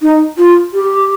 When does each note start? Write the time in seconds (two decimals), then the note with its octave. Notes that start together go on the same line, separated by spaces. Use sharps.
0.02 D#4
0.38 F4
0.74 G4